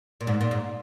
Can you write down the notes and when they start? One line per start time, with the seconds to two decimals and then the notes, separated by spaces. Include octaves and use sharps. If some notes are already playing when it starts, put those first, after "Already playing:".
0.21 A#2
0.27 G#2
0.41 A#2
0.51 G#2